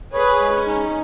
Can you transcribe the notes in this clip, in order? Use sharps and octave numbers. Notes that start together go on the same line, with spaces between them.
G#4 B4 C#5
G#3
C#4
D#4